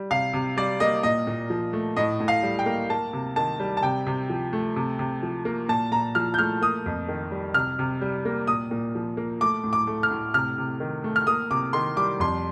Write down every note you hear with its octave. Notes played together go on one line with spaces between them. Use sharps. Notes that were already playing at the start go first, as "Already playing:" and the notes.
Already playing: G3
C3 F5
C3
G3 D5
A#3 D#5
A#2 D#5
A#2
F3
A3
A2 D#5
A2
F5
G3
G5
A#3
A#3 A5
C3
D#3 A5
G3
A5
C3 G5
C3
F3
A3
C3
C3
F3
A#3
A#2 A5
A#2 A#5
F3 F6
G6
A3 F6
A#3 D#6
F2
D#3
G3
C3 F6
C3
G3
A#3
A#2 D#6
A#2
F3
A#3
A3 D6
A2
D6
A3
F6
A2
C3 F6
C3
D#3
A3
F6
A#3 D#6
C3 D6
D#3 C6
G3 D6
F2 C6